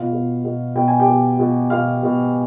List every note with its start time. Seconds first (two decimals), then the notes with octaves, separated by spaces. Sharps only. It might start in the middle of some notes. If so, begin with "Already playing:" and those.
Already playing: B2 F4 F5
0.13 B2
0.45 B2
0.75 B2 G5
0.88 G#5
0.99 G4 G5
1.08 B2
1.39 B2
1.70 B2 F5 F6
2.03 B2